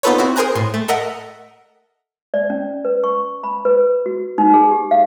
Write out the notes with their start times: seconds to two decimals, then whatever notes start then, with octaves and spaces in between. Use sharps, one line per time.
0.03 B3 D#4 F4 A4 B4 C#5
0.18 C4 E4 F#4
0.36 G#4 A#4 C5 G#5 A#5 F#6
0.55 A2 C6 C7
0.74 A3
0.88 A4 A#4 D#5 E5 F#5
2.34 D5
2.50 C#4
2.85 B4
3.04 C#6
3.43 B5
3.65 B4
4.06 F#4
4.38 D#4
4.54 G#4
4.71 G4
4.91 F5